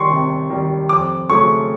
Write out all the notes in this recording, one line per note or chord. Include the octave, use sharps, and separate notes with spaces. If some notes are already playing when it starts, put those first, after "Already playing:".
Already playing: D#3 G3 C6 C#6
C3
D#3 G3
F2 D6
C#3 F#3 A3 C#4 C#6